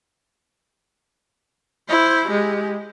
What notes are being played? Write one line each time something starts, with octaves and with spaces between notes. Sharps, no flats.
E4 C5
G#3 G4